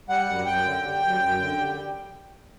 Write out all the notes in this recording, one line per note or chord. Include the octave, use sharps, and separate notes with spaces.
G3 F#5
F#2 F#5
F#2 G5
D3
G3
F#2
F#2
D3
G3